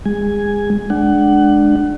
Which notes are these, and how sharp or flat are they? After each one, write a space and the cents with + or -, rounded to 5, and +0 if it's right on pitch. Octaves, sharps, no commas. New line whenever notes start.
G#3 -25 G#5 +0
G#3 +20 D4 +10 F#5 +25